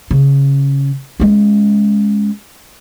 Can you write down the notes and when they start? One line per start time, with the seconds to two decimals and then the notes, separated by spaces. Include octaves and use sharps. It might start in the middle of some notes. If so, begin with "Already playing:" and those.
0.11 C#3
1.20 G#3 C#4